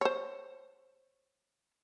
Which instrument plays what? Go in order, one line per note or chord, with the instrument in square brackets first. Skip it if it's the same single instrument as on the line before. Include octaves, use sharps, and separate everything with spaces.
[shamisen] C5 C#5